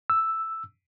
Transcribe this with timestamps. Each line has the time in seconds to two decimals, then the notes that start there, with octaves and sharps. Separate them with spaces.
0.10 E6